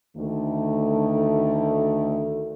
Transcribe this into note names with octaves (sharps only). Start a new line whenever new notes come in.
D2 D#3 A3